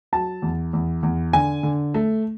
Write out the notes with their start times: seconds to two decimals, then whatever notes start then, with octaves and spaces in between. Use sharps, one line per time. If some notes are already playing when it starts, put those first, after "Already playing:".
0.12 F#3 A5
0.42 E2
0.73 E2
1.03 E2
1.33 D3 G#5
1.63 D3
1.94 A3